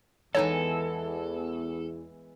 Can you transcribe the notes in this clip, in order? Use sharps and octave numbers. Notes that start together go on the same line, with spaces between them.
E2 E3 G#3 B3 D#4 A4 C#5